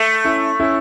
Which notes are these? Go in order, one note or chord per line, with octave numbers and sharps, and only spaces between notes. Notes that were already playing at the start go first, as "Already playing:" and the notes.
Already playing: A3
C#4 E4
C#4 E4